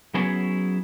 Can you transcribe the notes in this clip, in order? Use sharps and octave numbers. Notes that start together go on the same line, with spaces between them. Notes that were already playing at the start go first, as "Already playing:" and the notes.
F#3 B3 C#4 E4 G#4 C#5